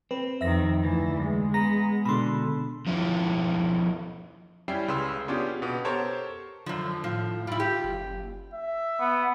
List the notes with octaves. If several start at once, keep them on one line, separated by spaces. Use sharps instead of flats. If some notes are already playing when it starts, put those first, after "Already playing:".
C4 B4
F2 D#3 E5 A#6
D2 E3
G#3
B3 A#5 A#6
B2 D3 B5 C6
F3 C#4 E4
G3 C#4 E4 E5 G5 C7
C#2 C#3 B4 C6 E6
B3 C#4 D4 F4 G4 G#4
B2 B3 G4
G4 A4 A#4 C5 C#5 A5
F#2 D3 F3
A2 F3
G3 E4 F4
G4
F#1
E5
B3